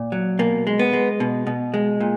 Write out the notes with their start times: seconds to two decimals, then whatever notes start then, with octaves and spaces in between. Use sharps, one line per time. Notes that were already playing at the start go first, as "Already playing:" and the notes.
Already playing: A#2
0.12 F#3
0.39 B2 A#3
0.67 G#3
0.79 B3
0.93 G#3
1.20 B2
1.47 B2
1.74 G#3
2.00 A#2